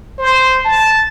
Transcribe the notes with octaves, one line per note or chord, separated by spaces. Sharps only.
C5
A5